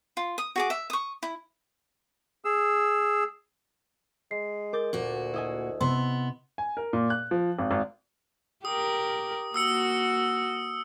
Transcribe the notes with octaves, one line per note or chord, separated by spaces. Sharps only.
F4
D#6
F#4 G#4 D6
E5
C#6 D#6
E4
G#4 E6
G#3 C7
A#4 D6 G6 A6
D2 A#2 F#4
E4 D#5 G#5
C3 B3 C4 C6
G#5
A#4
A#2
F#6
F3
G#1
G#1
G4 A#4 D#6
A#3 F#4 D#6 E6 C#7